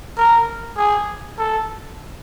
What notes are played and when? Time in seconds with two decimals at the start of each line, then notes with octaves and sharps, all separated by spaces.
0.18 A#4
0.77 G#4
1.39 A4